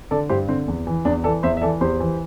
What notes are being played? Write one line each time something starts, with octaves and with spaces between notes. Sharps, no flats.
D3 A4 D5
G2 G4 C5
D3 C4
E2
E3
E2 D4
E3 A4 D5
E2 C5 E5
E5
E3 A4 D5
E2 G4 C5
E3